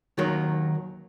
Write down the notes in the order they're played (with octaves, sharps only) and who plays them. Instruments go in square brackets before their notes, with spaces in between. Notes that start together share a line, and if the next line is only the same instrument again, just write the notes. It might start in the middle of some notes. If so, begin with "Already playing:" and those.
[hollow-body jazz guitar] D#2 D#3 F#3 A#3